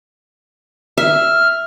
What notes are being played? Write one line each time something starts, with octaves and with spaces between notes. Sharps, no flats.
E5 F6